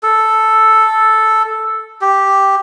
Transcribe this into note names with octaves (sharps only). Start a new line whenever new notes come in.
A4
G4